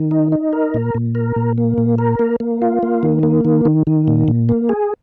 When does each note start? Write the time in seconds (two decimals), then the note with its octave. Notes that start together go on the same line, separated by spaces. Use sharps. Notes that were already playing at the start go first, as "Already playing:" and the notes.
Already playing: D#3
0.11 D#4
0.32 D#4
0.53 A#4
0.74 A#2
0.95 A#2
1.15 A#4
1.36 A#2
1.58 A#3
1.78 A#2
1.98 A#4
2.19 A#3
2.40 A#3
2.62 F4
2.83 A#3
3.03 D#3
3.23 A#3
3.45 D#3
3.65 D#3
3.87 D#3
4.08 A#2
4.28 A#2
4.49 A#3
4.69 G#4